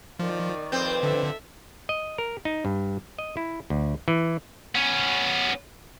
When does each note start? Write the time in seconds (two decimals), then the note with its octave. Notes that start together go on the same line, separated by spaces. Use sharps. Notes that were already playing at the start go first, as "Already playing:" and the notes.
0.19 D#3 F3 D5
0.72 F2 C4 B4 G6
1.03 D3 A4 E5
1.89 D#5
2.18 A#4
2.45 D#4
2.65 G2
3.19 D#5
3.37 E4
3.70 D2
4.08 E3
4.75 B3 C#4